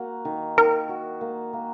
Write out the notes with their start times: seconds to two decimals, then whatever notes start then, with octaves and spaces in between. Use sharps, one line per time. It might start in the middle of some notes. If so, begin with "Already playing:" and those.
Already playing: A#3 F#4
0.25 D#3
0.57 D#3 A#4
0.89 F#4
1.21 A#3
1.53 A#3